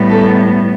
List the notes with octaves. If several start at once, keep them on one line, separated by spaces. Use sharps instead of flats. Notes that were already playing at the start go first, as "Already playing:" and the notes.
Already playing: A2 G3 B3
A4